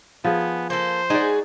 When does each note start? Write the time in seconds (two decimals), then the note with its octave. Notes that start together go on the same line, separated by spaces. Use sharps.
0.24 F3 B3 G#4
0.70 A#3 A4 C5
1.10 G#3 D#4 F#4 G#4 D5